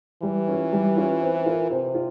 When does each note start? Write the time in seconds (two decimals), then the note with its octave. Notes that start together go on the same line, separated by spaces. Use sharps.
0.22 E3 G3
0.47 C#4 F4
0.72 G3
0.97 C#4 F4
1.22 C4
1.46 F4 A#4
1.70 C3 C4
1.95 F4